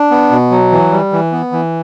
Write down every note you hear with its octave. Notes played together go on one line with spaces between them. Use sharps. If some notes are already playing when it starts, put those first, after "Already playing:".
Already playing: D4
B3
B2
F#3
E3
G3
E3
B3
E3